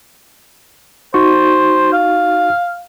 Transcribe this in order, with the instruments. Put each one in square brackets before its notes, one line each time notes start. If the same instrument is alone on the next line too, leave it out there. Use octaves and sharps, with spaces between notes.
[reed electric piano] D#4 F#4 C#6 [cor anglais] C5
[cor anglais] F5